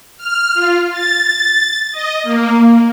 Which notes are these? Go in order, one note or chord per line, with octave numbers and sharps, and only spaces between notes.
F6
F4
A6
D#5
A#3